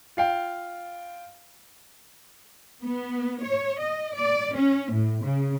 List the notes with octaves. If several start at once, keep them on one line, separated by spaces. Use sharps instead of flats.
F4 F5 G5
B3
C#5
D#5
D5
C#4
A2
C#3